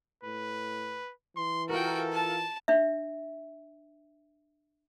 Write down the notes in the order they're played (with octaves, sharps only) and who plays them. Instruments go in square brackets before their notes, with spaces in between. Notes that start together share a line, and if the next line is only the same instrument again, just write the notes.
[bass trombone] A2 [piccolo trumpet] B4
[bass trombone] E3 [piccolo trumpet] C6
[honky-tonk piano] F4 A#4 [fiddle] F#4 G5 [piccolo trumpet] A4
[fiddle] A5
[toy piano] D4 E5